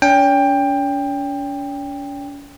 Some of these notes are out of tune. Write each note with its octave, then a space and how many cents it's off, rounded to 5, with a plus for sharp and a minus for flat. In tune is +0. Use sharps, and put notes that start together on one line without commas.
C#4 +45 G5 +20